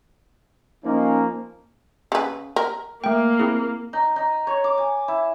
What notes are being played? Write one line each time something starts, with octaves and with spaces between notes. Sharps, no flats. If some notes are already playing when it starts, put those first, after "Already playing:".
F3 A#3 C#4 D#4
C#3 B4
A#4
A3 A#3 G5
C4 E4 G#4
D#4
D#4
C#5
D6
G#5
E4